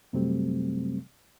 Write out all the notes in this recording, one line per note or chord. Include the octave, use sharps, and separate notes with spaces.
F#2 C3 F#3 G3 A3 C4